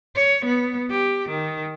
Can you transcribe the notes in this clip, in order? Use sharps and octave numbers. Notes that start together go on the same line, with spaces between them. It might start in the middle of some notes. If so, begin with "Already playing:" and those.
C#5
B3
G4
D#3